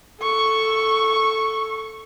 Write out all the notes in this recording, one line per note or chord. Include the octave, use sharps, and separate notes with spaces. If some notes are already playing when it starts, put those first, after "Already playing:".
A4 C#6